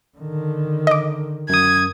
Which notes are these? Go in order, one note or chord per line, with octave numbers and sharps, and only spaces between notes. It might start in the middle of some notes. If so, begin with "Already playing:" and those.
D3 D#3
D#5 D6
F#2 D#6 G#6